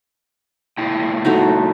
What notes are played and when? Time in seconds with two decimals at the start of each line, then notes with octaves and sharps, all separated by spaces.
0.78 A#2 E4 G5
1.25 F#3 A3 D#4